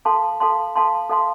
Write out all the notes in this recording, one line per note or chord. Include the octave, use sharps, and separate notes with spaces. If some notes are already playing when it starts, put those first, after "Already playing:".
A4 F5 A5 C6
A4 F5 A5 C6
A4 F5 A5 C6
A4 F5 A5 C6